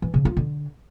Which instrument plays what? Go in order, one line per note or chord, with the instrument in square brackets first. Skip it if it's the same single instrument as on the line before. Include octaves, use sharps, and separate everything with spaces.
[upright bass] E3
C#3
F4
D3